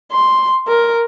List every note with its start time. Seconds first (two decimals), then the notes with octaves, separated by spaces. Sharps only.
0.12 C6
0.67 A#4